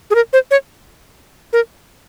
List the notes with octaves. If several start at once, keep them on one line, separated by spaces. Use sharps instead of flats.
G#4
A#4
C5
C#5
A#4